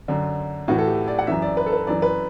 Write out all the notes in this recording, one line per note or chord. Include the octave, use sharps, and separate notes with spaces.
F#2 D3
A2 E3 F#4
A4
G4
D5
F#5
F#2 E3 E5
D5
B4
A4
B4
F#2 E3 D5
B4